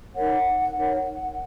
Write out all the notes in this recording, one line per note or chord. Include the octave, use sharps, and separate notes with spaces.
D#4 A#4 C#5 F#5
D#4 A#4 C#5